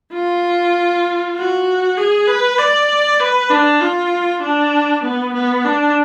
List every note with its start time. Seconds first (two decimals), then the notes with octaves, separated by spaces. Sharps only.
0.13 F4
1.35 F#4
1.97 G#4
2.27 B4
2.58 D5
3.20 B4
3.50 D4
3.80 F4
4.42 D4
5.03 B3
5.34 B3
5.64 D4